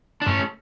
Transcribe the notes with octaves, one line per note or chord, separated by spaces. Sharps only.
D4
G2 A3 C#4